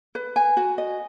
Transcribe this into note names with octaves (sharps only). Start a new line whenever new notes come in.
B4
G#5
F#4
D#5